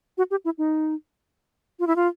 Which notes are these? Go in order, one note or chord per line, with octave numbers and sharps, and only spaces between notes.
F#4
G4
E4
D#4
F4
E4
F4